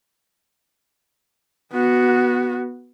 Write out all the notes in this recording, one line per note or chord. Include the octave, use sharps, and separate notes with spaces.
B3 F#4